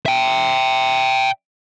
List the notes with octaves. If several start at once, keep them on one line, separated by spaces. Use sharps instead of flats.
E5 G5